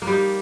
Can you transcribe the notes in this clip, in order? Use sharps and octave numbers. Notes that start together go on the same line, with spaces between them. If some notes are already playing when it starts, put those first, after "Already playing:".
A#3
G3
D#4